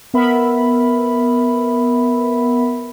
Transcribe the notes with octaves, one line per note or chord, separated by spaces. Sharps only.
B3 A#4 E5 B5